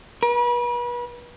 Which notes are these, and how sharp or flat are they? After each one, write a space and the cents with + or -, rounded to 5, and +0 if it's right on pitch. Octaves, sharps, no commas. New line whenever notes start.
B4 -35